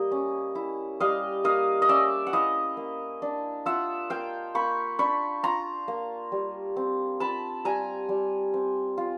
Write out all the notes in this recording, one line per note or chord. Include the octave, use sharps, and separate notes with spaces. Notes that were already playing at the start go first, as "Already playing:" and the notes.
Already playing: G3 A#3 D#5
C#4
E4
G3 D#5 F5
A#3 D#5 F5
D#5
C#4 D5 E5
F#5
E4 D#5 F5
A#3
D4
F4 E5 F#5
A#3 F5 G5
A#3 B5 C#6
D4 B5 C#6
F4 A#5 C6
A#3
G3
C4
F4 A5 B5
G3 G#5 A#5
G3
C4
F4